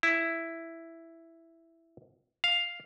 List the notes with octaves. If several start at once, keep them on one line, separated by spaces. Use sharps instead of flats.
E4
F5